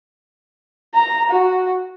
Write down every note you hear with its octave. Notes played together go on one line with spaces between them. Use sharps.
A#5
F#4